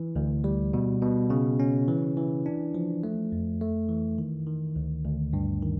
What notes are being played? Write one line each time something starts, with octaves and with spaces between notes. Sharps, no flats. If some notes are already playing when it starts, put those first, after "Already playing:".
Already playing: E3
D2
G3
B2
B2
C#3
C#4
E3
E3
D4
F3
A3
F2
A3
E3
D#3
D#3
D2
D2
G2
D#3